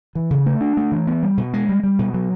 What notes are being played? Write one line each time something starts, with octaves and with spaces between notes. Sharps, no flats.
E3
C#3
A3
D4
A3
E3
B3
G3
B2
G#3
G3
G3
B2
F#3